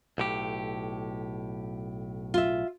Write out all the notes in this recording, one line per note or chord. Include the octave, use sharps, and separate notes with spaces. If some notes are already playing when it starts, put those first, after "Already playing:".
B1 A2 G4
F4 E5